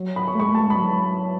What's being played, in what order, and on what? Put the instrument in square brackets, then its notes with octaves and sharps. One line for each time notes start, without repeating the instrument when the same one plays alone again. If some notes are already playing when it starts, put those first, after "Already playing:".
Already playing: [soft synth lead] F#3
[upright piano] B5
C#6
[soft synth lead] A3
[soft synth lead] G#3 [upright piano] C#6
[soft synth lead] A3 [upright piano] A5
[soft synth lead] G#3
[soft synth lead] F#3 [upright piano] B5